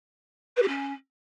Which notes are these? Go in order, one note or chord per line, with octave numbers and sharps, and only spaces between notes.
B4
G4
C#4